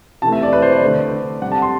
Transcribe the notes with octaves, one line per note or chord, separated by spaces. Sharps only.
C3 E3 A3 A5
E5
D5
B4
C5
D5
D3 A3
C3 G3 F#5
A5
C6